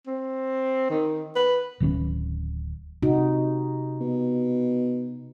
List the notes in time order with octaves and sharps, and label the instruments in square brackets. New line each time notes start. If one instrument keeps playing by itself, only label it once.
[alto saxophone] C4
D#3
B4
[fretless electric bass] D1 D#3 C4 C#4
[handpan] C3 D#4 F#4
[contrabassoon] B2